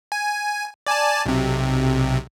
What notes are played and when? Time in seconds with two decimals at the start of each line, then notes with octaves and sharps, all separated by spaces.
0.12 G#5
0.87 D5 G#5 A5
1.26 B1 C3